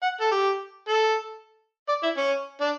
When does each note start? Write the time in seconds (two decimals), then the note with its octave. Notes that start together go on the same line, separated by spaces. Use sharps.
0.02 F#5
0.21 A4
0.31 G4
0.88 A4
1.88 D5
2.03 E4
2.17 C#4
2.61 D4